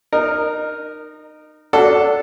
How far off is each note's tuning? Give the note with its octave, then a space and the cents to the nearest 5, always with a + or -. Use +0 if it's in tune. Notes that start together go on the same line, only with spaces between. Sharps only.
D#4 -25 A#4 +0
D4 -15 F#4 +0 A4 +0